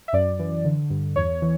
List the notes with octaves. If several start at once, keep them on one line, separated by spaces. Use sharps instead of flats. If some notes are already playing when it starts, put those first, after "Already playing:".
E5
F#2 D5
E3
D3
G2
E2 C#5
E3